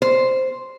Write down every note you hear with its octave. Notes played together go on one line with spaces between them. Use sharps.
C5